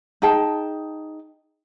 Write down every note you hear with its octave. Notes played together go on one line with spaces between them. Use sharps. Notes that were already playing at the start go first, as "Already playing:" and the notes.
D#4 G#4 G5 A5